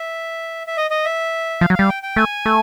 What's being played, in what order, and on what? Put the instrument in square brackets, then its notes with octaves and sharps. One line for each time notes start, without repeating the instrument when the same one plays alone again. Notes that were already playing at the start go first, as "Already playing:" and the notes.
Already playing: [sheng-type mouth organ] E5
E5
D#5
D#5
E5
[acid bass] F3 [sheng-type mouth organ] F5
[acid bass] F#3
[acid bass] G3 [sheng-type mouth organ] F5
[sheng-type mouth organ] G5
G5
[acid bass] A3 [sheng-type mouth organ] G#5
[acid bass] A3